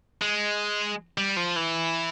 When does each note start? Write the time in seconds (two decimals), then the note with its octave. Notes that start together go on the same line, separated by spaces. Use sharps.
0.21 G#3
1.18 G3
1.37 F3
1.56 E3